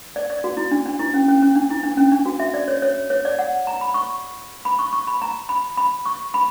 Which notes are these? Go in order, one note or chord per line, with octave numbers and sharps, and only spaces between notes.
D5
D5
F#4
E4
D4
D4
E4
C#4
C#4
C#4
D4
E4
D4
C#4
D4
F#4
E5
D5
C#5
C#5
C#5
D5
F#5
A#5
B5
C#6
B5
C#6
C#6
B5
A#5
B5
B5
C#6
B5